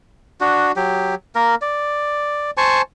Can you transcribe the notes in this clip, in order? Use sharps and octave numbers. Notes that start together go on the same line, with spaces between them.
D4 F#4
F#3 G4
A#3 A#4
D5
C5 G#5 A5 C#6